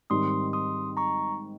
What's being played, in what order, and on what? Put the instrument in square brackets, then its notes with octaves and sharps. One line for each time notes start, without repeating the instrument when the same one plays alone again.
[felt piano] G#2 D#3 G3 C4 [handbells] C6 D#6
[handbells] C6 D#6
A#5 C#6